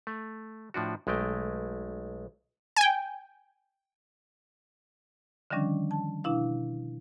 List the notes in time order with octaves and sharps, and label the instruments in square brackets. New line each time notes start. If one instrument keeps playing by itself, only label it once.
[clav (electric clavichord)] A3
A2 F3 D4 F#4
B1 G#3 A3 G5
[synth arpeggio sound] G5 G#5
[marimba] D3 D#3 F3 G3 C#4 D4
A5
B2 D4 E4 F5